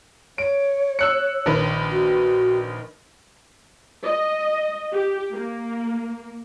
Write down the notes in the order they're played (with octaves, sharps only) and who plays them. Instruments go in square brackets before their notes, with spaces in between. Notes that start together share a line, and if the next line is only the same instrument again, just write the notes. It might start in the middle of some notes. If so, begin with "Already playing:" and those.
[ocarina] C#5 [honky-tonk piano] D7
[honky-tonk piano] E6 F#6 C#7
A#1 D#3 B4
[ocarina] F#4
[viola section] D#5
G4
A#3